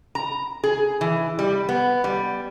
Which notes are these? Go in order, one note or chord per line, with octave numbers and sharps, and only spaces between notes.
A#5
G#4
E3
G3
B3
G3